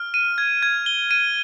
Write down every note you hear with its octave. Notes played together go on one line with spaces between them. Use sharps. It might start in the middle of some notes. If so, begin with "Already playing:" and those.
Already playing: F6
D#7
G#6
G#6
G7
D#7